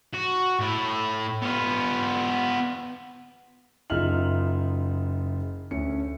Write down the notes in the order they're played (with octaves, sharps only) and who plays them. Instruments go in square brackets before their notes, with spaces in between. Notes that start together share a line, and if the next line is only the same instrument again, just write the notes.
[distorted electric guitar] F#4
A2 E4
B3 F4
[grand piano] F#1 D#4 F4 E5 F6 F#7
D2 C#4 C#7